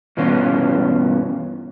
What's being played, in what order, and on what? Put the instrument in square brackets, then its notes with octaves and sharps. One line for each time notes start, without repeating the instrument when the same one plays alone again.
[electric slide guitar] G2 B2 E3 B3 C#4 F4